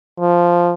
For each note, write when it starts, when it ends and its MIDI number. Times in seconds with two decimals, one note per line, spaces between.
0.20 0.73 53